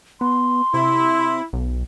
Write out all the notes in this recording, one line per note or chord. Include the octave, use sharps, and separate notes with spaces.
B3 C6
C3 E4
B1